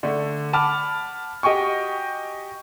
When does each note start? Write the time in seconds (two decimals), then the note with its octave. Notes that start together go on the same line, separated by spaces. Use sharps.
0.03 D3 A3
0.53 F#5 A5 B5 D6 F6
1.43 F#4 G4 D#5 G5 G#5 C#6